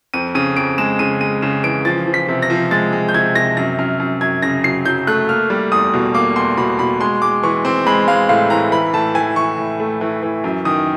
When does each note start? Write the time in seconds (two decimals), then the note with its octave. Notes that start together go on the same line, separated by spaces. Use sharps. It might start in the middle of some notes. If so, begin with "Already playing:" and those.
0.14 F2 D#7
0.35 C#3 D#7
0.57 F2 D7
0.78 G#3 E7
0.99 C#3 D#7
1.21 G#3 D#7
1.42 C#3 E7
1.64 E3 D7
1.85 F3 A6
2.07 F3
2.14 B6
2.28 C3
2.42 A#6
2.50 F3
2.71 G#3 A6
2.93 G#3
3.09 G6
3.14 C3 G#6
3.35 C3 A#6
3.57 F#2 A#6
3.79 F#2 F6
4.00 F#2
4.21 F#2 G#6
4.42 C#3 A#6
4.64 F#3 C7
4.85 F#3 G6
5.07 A3 F#6
5.29 A#3 F6
5.50 G3
5.72 E2 D#6
5.93 B2
6.14 A#3 D6
6.36 E2 C6
6.57 B2 B5
6.79 B2 B5
7.01 G#3 C6
7.22 G#3 D6
7.43 E3 C#6
7.65 C4 C6
7.87 G#3 B5
8.08 G#3 F5
8.29 A2 F5
8.50 E3 A#5
8.72 E3 B5
8.94 A2 A5
9.15 E3 G#5
9.36 E3 C#6
9.58 A2
9.80 A3
10.01 E3
10.23 E3
10.44 F#2
10.65 D#3 D#6